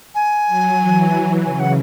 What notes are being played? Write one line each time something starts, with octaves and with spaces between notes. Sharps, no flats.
G#5
F#3
E3
C#3 G#5
F#5